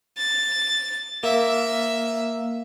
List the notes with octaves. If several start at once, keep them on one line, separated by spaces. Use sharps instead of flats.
A6
A#3 E5